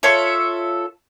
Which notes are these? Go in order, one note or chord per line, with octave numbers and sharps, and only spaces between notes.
F4 A4 C#5 E5